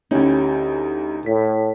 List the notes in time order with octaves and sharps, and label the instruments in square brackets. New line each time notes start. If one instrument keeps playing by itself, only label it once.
[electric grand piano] D2 D#4 [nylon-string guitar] C#4 E4 G4
[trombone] A2 [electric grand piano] B6